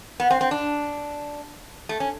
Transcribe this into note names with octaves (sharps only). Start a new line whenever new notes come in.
B3
C4
C4
D4
A3
C#4